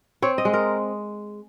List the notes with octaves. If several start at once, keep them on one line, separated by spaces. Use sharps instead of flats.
C4 C#5
D#5
G#3
A#4